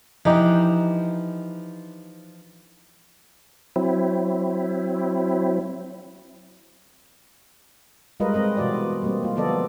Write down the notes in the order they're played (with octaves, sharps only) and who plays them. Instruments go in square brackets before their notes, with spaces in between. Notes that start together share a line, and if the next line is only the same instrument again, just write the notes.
[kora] E3 D#4 G4 [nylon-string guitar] F3 D4
[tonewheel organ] F#3 C4 E4
[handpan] G3 G#3 F4 A#4 B4 D#5
G#3 C4 A#4 D#5
B2 E3 F4 F#4 D5
G3 A#3 C4
A#3 F4
D3 F3 B3 A4 D5 D#5